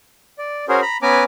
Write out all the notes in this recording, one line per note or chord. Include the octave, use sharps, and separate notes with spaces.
D5
C#4 F#4 G#4 A#4 C5
A#5 B5
B3 C#4 B4 G#5 A#5 D6